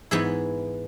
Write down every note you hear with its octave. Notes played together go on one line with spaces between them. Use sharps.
G#2 E3 B3 E4 G#4